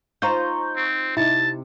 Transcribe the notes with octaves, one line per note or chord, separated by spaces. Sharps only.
D#4 F4 C5 A#5 C#6 G6
C4
C3 D#4 E4 A5